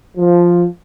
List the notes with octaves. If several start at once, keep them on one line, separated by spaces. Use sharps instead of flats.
F3